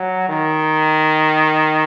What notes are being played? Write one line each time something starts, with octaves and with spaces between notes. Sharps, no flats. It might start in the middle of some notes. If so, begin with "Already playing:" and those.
Already playing: F#3
D#3